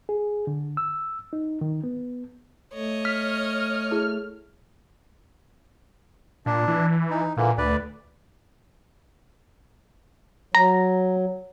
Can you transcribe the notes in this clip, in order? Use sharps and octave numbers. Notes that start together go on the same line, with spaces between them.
G#4
D3
E6
D#4
D#3
B3
A3 C#5 D#5
F6 B6
E4 G#4
A#2 D4
E3
D#4
A#2 D3 E3 A#3
D2 B4 D5
F#3 A#5